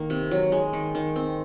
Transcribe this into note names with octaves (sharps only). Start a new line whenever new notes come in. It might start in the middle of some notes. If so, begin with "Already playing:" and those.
Already playing: D#3 A#3
C3
F#3
G#3
D#3
D#3
C4